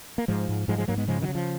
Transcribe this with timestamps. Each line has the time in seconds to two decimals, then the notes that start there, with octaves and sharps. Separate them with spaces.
0.18 A#3
0.28 G#2 F3 G#3
0.49 G#2
0.68 G#2 F3 G#3
0.78 F3 G#3
0.88 G#2 F#3 A#3
0.98 G#3 B3
1.08 C#3 F3 G#3
1.21 D#3 F#3
1.29 C#3
1.35 F3